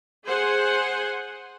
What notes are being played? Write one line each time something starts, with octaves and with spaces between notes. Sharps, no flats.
G#4 C5 F#5 G#5